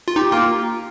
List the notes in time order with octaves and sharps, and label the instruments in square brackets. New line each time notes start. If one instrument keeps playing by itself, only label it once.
[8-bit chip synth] F4
[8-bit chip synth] D#4 [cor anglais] G4
[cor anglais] A#3 [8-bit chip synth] F4